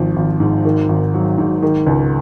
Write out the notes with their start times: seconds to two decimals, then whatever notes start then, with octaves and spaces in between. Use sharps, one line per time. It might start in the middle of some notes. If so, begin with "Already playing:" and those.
Already playing: G#1 F3
0.16 G#1
0.40 G#2
0.65 D#3
0.89 G#1
1.14 F#3
1.38 G#2
1.62 D#3
1.86 C#2